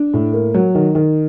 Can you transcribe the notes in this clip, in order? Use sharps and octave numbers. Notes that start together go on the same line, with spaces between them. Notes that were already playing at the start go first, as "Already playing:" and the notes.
Already playing: D4
A2
A#3
F#3
D#3
D#3